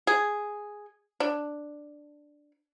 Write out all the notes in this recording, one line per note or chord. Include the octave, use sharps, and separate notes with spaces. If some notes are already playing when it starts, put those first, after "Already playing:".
G#4
D4